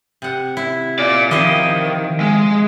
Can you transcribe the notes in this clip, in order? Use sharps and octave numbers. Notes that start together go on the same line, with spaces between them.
C3 F#5
E4
F4 D5
D#3 F3 E4 D#5
G#3